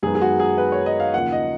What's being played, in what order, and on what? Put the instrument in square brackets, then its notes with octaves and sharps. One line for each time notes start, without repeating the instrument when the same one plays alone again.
[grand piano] F#2 D#3 G#3 B3 G#4
G#4
F#4
G#4
B4
C#5
D#5
F5
D#2 C#3 F3 A#3 F#5
D#5